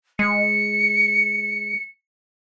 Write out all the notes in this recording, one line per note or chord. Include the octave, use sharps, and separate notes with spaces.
G#3 C#7